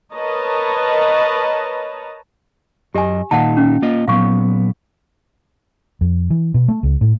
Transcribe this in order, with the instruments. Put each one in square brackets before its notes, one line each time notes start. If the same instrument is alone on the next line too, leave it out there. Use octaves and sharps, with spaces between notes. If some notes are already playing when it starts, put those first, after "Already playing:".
[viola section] A#4 B4 C#5 D#5 A5 A#5
[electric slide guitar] F#2 D#5 [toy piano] G4 G#5
[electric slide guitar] A#2 D#3 D#4 [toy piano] F5 F#5 A5
[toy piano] C#4
[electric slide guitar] A#3 F4 D#5
[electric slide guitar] A#2 F#3 B3 [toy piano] F5 C#6
[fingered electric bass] F2
E3
B2
A3
C#2
A2